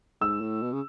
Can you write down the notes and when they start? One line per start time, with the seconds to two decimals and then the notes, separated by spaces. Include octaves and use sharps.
0.21 G#2 E6
0.41 A2
0.62 B2
0.73 C#3